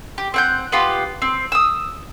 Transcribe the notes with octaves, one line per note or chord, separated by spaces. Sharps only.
G4
C4 F#5 G6
B3 F4 G4
C4
D#6 E6